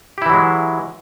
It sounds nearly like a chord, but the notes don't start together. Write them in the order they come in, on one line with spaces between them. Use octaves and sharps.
G4 E4 E3 F#3 G#3